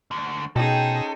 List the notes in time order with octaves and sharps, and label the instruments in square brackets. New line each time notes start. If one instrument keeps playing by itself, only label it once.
[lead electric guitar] D2 D3
[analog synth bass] B2 [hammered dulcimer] C#4 C5 G5 [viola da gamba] D#4 G#4 [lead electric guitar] A4